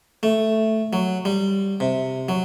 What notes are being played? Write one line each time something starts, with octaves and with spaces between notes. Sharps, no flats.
A3
F#3
G3
C3
F#3